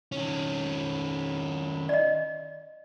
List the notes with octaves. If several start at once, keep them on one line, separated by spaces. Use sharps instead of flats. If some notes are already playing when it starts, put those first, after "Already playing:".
D#3 C#4
D5 D#5